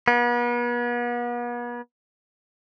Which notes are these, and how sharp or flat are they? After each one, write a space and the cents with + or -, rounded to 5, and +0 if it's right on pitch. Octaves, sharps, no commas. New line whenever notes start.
B3 -40